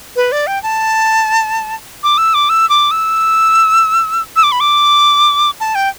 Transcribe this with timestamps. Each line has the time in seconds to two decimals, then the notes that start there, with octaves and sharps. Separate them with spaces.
0.16 B4
0.32 D5
0.47 G5
0.63 A5
2.03 D6
2.18 E6
2.34 D6
2.49 E6
2.70 D6
2.91 E6
4.36 E6
4.43 D6
4.52 B5
4.60 D6
5.60 A5
5.75 G5